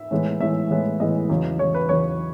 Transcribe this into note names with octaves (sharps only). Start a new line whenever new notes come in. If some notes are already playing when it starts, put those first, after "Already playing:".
Already playing: E5
A2 E3 G#3 B3
A2 E3 G#3 B3 E5
A2 E3 G#3 B3
A2 E3 G#3 B3 D#5
E2 C#3 F#3
E2 C#3 F#3 C#5
B4
E2 C#3 F#3 C#5